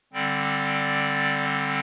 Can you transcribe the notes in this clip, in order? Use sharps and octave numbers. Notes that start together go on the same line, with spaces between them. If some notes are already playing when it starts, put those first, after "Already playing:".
D3 G3 C4 D5